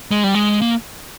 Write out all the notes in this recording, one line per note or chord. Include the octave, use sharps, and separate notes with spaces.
G#3
G3
G#3
A#3